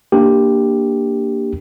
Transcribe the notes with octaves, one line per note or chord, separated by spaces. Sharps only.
A#3 D4 G4